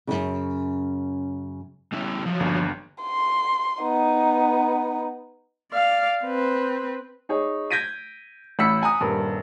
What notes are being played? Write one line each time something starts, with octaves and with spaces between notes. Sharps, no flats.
F#2 A#2 C#3
G3 C#4 E4
F3 F#3
G1 D#2 D4
C6
B3 D#4
D5 F5
C4 B4
D#4 G#4 C#5
G6 G#6 A#6 B6 D7 D#7
A1 F#5 B5 E6 B6 C#7
F#5 G#5 A#5 D#6
D#1 G2 A#4